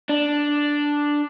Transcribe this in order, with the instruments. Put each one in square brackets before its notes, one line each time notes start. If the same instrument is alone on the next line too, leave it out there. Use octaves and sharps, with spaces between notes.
[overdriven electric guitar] D4